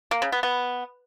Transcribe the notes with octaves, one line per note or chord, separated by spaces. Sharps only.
A#3
C#3
B3
B3